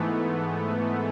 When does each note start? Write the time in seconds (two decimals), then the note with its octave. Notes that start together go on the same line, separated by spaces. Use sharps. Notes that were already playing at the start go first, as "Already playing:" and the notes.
Already playing: G#2 E3 A3 B3